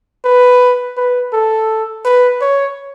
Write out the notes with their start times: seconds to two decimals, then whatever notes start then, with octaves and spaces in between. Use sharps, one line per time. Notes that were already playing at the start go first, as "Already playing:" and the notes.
0.25 B4
0.97 B4
1.33 A4
2.05 B4
2.41 C#5